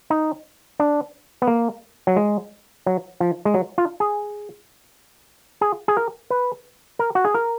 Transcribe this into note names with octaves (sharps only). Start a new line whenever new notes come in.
D#4
D4
B3
A#3
F#3
G#3
F#3
F3
G#3
F#3
F4
G#4
G#4
G#4
A#4
B4
A#4
F#4
G#4
A#4